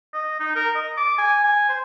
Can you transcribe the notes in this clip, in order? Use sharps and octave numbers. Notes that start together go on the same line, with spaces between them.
D#5
D#4
A#4
D#5
D6
G#5
G#5
C5